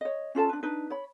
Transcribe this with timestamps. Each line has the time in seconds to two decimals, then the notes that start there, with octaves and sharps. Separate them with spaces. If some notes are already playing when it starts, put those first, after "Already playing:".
0.01 C#5 D#5
0.35 C#4 F4 A4 A5
0.49 D4 B4
0.63 D4 D#4 B4
0.90 C#5 B5